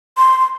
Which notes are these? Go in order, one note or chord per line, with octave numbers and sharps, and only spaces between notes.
C6